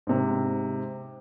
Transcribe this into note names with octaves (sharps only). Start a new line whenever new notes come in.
G#2 C3